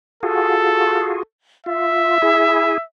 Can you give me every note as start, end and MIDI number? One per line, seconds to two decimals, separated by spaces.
0.23 1.23 65
0.23 1.23 66
0.23 1.23 68
0.23 1.24 69
1.66 2.18 65
1.66 2.84 76
2.22 2.78 64
2.22 2.78 68